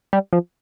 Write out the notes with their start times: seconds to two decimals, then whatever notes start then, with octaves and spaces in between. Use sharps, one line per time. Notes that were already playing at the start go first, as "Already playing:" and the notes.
0.13 G3
0.33 F3